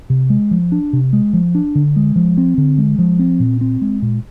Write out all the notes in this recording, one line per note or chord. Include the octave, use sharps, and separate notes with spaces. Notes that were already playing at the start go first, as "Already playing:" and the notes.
C3
G#3
F3
D4
C3
G#3
F3
D4
D3
G#3
F3
C4
D3
G#3
F3
C4
A#2
C4
G#3
A#2